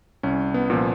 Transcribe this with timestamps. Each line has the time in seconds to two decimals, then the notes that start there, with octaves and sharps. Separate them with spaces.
0.23 C2 C#4
0.54 B3
0.70 A#2 F3